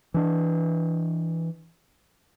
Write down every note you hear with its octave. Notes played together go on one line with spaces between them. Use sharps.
E3 D4